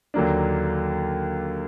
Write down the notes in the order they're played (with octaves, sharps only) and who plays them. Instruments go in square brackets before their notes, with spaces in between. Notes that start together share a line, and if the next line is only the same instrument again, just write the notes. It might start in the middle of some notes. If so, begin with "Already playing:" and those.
[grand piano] D#2 D3 F#3 A#3 D4